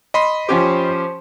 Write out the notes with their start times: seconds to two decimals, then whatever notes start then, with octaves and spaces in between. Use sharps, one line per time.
0.14 D#5 B5 C6
0.49 F3 C#4 G4 C5